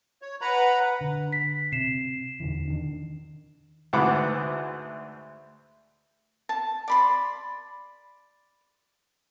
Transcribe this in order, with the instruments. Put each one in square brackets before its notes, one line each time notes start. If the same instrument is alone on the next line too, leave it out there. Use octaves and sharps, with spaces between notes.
[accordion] C#5
B4 F#5 A#5 B5
[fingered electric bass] D3
[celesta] B6
[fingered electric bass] C3 [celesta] C7 E7
[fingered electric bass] E2 D3 E3
D#3 D4
[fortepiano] D2 G#2 E3 F#5 B5 D6
[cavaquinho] A5
D5 B5 C6